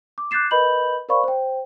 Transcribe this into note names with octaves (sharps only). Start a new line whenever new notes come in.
D6
D6 F#6 G6 A6 C7 E7
A#4 B4 D#5 B5 G6 F#7
A#4 C5 D5 F5 B5 C#6
C5 G5